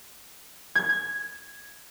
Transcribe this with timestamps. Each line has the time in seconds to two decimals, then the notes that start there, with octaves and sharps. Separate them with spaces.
0.75 G#6